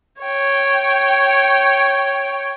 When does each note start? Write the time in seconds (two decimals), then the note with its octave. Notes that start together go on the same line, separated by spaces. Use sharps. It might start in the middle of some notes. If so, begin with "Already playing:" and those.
0.22 C#5 G5